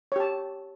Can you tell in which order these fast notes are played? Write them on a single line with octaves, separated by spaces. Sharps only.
C#5 G4 A5